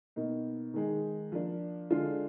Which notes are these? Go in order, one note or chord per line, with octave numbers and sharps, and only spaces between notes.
B2 A#3 D#4
D#3 G#3 D#4
F3 A#3 D4
D3 G#3 D4 F4